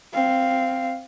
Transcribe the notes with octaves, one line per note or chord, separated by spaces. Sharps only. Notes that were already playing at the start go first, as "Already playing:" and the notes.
C4 F5